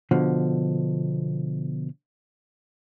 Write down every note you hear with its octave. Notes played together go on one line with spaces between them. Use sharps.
B2 D3 F3